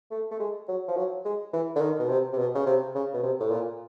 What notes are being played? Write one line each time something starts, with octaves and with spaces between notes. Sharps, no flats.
A3
A3
G#3
F#3
F3
F#3
G#3
E3
D3
D#3
B2
C3
C3
B2
C#3
C3
C#3
B2
C3
A2
A#2